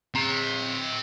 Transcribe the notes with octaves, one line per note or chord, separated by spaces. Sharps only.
C4 A#5